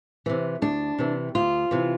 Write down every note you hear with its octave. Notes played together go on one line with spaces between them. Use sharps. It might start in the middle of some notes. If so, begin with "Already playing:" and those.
C3 E3
D2 D4
C3 E3
D2 F4
C3 E3